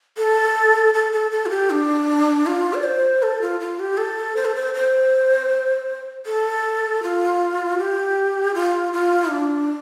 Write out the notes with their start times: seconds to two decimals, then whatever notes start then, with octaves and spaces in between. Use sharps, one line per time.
0.18 A4
0.94 A4
1.13 A4
1.31 A4
1.46 F4
1.50 G4
1.70 D4
2.46 F4
2.74 D5
2.83 C5
3.23 A4
3.42 F4
3.60 F4
3.79 G4
3.97 A4
4.36 C5
4.45 A4
4.55 C5
4.74 C5
6.26 A4
7.03 F4
7.78 G4
8.54 F4
8.93 F4
9.31 D4